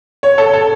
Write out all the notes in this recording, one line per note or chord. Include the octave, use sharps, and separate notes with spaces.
C#5
A4
A4